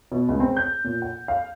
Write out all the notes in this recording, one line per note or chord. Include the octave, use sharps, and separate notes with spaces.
B2
C#2
C4
G6
A#2
F#5
F5